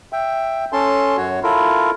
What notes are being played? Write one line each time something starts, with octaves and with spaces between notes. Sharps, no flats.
E5 G5
C#4 A4 A5 C6
F#2 F#4 C#5
E4 F4 A4 A#4